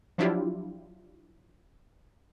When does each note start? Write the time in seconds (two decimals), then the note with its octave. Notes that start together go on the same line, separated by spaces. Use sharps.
0.18 F3 F#3 D4 E4 F4 G4